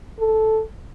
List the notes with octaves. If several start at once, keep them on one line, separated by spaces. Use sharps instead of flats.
A4